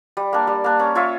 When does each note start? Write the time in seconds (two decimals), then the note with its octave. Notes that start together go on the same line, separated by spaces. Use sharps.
0.17 G3
0.33 A#3 D4
0.47 G3
0.64 A#3 D4
0.79 C#4
0.95 F4 C#5 E5